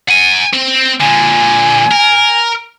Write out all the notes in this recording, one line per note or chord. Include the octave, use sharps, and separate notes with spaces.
F#5 G#5
C4
A#2 D3 G#5
A#4